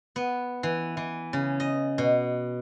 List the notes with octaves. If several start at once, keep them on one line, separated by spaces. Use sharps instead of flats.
B3
E3
E3
C#3
D#5
B2